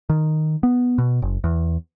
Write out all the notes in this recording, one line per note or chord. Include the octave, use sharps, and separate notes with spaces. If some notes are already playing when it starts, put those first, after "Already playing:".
D#3
B3
B2
F#1
E2